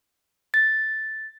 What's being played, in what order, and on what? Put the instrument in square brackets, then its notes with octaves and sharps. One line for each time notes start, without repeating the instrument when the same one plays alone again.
[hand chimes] A6